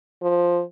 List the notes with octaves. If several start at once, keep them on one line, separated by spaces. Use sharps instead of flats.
F3